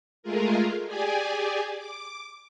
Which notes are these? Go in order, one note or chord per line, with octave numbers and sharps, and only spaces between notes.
G#3 A3 F4 G#4 A#4
G4 G#4 D5 G#5
D6